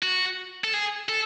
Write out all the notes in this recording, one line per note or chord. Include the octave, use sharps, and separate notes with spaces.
F#4
A4
G#4
A4